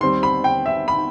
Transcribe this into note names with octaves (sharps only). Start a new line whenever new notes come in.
D#2 D#3 G3 C4 C6
B5
G5
E5
B5